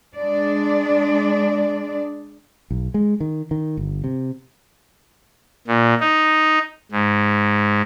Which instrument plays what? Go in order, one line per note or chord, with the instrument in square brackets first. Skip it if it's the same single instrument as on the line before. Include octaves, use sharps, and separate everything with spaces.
[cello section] G#3 D4 D5
[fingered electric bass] B1
G#3
D#3
D#3
G1
C3
[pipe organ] A#2
D#4
G#2